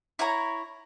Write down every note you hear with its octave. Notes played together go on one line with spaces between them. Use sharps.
E4 C#5 A#5